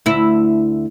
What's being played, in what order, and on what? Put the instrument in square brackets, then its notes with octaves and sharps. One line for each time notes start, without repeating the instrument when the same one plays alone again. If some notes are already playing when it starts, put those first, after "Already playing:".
[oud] D2 E4